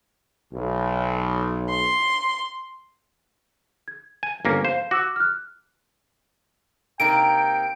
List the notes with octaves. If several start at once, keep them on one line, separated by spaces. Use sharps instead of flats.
B1
C6
G#6
G#5
G1 A#3 C#4
C5 F5
F#4 D6 E6 F#6
F6 F#6
C3 A#3 D#4 G5 D7